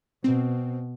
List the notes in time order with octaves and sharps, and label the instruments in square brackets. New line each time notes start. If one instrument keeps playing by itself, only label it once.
[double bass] B2 [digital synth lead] C4